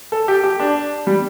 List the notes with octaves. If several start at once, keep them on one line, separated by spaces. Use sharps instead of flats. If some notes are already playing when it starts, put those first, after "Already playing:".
A4
G4
G4
D4
G3